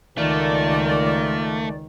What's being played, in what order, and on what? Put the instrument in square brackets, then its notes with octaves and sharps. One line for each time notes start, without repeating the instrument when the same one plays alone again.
[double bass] C#2 D#3 [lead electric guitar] A3 [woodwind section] F4 A#4 D5